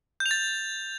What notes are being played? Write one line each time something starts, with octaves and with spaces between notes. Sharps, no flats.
G6
F7
A6